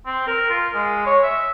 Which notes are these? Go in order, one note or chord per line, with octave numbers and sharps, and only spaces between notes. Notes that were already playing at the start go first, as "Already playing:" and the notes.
C4
A#4
F4
G#3
C#5
E5